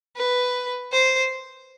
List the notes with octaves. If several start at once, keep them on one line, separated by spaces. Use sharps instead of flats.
B4
C5